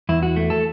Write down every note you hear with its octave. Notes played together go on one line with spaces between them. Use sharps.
E2 E4
F#4
A3
A4